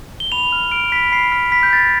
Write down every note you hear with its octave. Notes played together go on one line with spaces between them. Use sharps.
G7
B5 F7
F6
F6 D7
B5 B6
B5 C7
F6 B6
B5 B6
G6
B5 A6